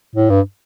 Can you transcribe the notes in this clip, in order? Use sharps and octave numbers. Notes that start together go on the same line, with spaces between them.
A2
G2